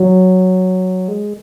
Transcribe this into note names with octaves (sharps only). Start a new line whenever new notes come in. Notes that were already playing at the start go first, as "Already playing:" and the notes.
Already playing: F#3
G#3